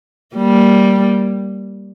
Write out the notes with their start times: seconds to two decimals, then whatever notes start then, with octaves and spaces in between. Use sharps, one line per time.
0.36 G3 A#3